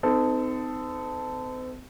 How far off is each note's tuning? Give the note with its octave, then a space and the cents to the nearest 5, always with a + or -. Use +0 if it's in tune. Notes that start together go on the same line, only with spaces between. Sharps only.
C4 -40 D#4 +0 A4 +0